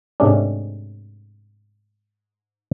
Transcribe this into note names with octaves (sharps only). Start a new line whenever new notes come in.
G#2 C3 A3 C#4 D4